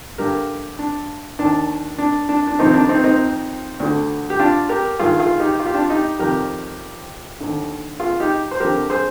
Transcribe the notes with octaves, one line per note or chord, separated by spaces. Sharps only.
G2 D3 G4 A#4
D4
D#2 D#3 D4
D4
D4
D4
F2 C3 D#3 C4 D#4
D4
C4 D#4
C4 D#4
D2 D3
G4
D4 F4
G4 A#4
G2 D#3 F4 G#4
F4 G#4
D#4 G4
F4
G4
D4 F4
D#4 G4
F2 C3 D#3 G4 A#4
D#2 D3
F4 G#4
D#4 G4
C5
F2 D3 G4 A#4
G#4 C5